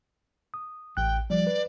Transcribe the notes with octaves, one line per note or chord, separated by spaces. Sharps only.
D#6
A1 G5 F#6
F3 G3 D5
B4